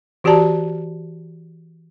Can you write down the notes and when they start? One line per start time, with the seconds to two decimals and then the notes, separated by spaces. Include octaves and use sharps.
0.24 E3 F#4 G4 D5 A5 A#5